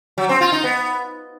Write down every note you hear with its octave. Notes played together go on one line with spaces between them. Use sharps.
F#3
C4
F4
D#4
B3